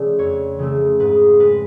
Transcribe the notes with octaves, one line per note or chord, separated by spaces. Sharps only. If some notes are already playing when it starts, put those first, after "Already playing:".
Already playing: C#3 F3 A3 D5
F2 C#5
C#3 F3 A3
G#2 B4
G#3 B4